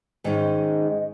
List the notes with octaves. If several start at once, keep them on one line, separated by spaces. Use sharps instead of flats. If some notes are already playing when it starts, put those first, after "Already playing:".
G#2 D#3 G#3 C#4